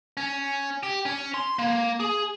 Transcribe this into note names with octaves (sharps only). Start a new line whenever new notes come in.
C#4
G4
C#4
C6
A#3
G#4